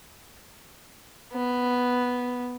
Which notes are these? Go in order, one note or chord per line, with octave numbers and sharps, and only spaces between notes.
B3